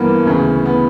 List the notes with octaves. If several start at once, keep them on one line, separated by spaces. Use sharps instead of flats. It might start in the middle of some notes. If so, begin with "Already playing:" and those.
Already playing: G2 E3 A#3 B3
D2 C#3 E3
B3